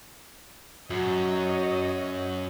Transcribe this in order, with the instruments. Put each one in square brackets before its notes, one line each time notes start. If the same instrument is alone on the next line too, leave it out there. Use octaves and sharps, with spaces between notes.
[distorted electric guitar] F#2 [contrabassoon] F#3 [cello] C#5 D#5